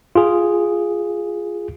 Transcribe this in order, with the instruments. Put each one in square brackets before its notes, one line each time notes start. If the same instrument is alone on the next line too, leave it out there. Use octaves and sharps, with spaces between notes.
[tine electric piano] F4 G#4